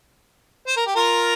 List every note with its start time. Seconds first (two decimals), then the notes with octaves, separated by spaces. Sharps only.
0.67 C5
0.77 A#4
0.86 G4
0.96 F4 A#4